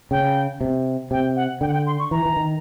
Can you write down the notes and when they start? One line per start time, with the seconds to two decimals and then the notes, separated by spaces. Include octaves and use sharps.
0.11 C#3 G5
0.61 C3
1.11 C3 G5
1.36 F#5
1.61 D3 G5
1.68 F#5
1.73 G5
1.86 C6
1.99 C#6
2.11 E3 A#5
2.26 E3
2.37 D#3